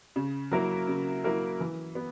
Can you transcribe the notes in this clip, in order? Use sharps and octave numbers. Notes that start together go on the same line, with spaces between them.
C#3
F#3 A#3 E4 A#4
C#3
F#3 A#3 E4 A#4
E3
B3